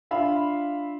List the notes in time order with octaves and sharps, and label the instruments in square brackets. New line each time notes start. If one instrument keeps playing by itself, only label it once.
[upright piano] D4 F4 E5 F5 B5